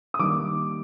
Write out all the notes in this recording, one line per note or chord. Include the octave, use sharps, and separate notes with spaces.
D#6
D#3 G3 A#3 D6